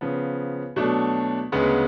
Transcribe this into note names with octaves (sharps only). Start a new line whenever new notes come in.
C#3 F3 B3
B2 F#3 A3 D4
D2 C#3 G#3 B3